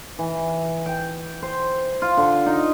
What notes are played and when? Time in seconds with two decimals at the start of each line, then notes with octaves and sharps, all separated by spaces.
0.19 E3
0.86 G5
1.42 C5
2.02 F4
2.17 D3
2.46 D#4